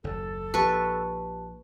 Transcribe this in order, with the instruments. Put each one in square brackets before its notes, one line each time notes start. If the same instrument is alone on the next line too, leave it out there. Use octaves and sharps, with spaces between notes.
[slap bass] F#1 D#2 [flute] A4
[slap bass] A#1 [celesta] G4 A5 [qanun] B4 C#6